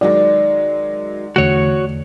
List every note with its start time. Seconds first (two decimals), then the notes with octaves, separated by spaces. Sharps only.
0.01 D#3 F#3 G#3 D5
1.36 E2 D3 A3 F#4 C#5